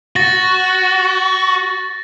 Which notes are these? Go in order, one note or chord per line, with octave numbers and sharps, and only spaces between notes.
F#4 A6 A#6